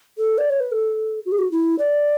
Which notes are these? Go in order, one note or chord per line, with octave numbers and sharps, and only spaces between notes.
A4
D5
C#5
B4
A4
F#4
G#4
F#4
E4
D5